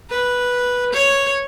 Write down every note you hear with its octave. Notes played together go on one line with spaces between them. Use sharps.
B4
C#5